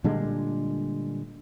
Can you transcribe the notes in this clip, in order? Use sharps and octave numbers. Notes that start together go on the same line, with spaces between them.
A#2 D3 G3 G#3